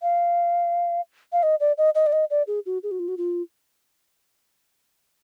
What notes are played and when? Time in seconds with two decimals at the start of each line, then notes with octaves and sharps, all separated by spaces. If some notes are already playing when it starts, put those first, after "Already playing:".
0.02 F5
1.33 F5
1.43 D#5
1.60 D5
1.78 D#5
1.95 D#5
2.06 D5
2.13 D#5
2.30 D5
2.47 G#4
2.66 F#4
2.83 G#4
2.91 F#4
2.99 F4
3.08 F#4
3.18 F4